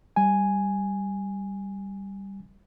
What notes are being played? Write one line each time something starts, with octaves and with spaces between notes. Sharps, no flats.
G3 G#5